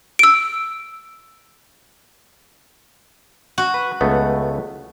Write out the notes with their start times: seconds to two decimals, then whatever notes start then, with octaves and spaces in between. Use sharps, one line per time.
0.19 E6 D7
3.58 F#4
3.74 B4
4.01 C#2 A3 B3